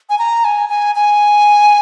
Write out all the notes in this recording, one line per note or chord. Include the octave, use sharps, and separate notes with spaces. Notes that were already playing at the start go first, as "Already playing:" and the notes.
G#5
A#5
G#5
G#5
G#5